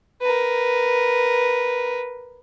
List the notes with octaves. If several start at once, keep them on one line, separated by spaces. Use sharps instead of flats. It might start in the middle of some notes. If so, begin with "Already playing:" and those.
A#4 B4